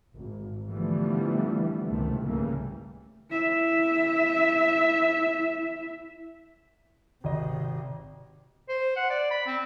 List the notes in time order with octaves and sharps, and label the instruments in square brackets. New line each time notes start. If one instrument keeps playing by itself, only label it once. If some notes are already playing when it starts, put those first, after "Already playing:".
[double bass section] G#1
D3 E3 F3 G3 A3 B3
C#2 G#2 C3 D#3 A3
C2 C#3 E3 G3 A3 A#3
[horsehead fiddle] E4 E5
[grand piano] G#1 D#5 [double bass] C3
[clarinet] C5
F#5
D5
B5
C4